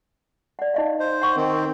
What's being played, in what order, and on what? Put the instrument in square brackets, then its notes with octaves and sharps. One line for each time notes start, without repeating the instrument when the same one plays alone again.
[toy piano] D5 F#5
D#4 D#5 F5
[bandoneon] C5
[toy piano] F#5 G5 C#6
[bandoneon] D#3 C4